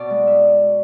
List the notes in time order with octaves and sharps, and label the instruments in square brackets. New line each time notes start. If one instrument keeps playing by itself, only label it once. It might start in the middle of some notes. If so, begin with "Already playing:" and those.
Already playing: [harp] B2 D5
G#3
E5